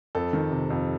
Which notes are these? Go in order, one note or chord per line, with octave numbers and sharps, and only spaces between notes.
F2 A4
D#3
C3
F2